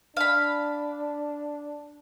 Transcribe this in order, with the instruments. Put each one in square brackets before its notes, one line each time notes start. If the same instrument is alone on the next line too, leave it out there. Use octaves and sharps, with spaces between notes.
[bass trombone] D4 [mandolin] F5 B5